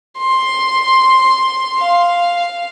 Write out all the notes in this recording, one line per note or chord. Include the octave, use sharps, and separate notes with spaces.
C6
F5